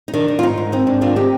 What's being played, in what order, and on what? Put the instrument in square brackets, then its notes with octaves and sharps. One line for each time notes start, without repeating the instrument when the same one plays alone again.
[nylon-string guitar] D#4
D#3 D4
D#3
F4
G#2 D#4
G#2
C4 D#4
G#2 D4
D#3 D4 F4
C4 D#4 G4